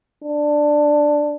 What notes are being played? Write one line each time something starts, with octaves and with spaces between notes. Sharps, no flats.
D4